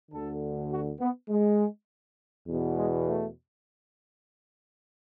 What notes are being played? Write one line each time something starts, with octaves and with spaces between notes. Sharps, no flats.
D2 D3 A4
F#4
B3
G#3
E2 B2
G#3
A3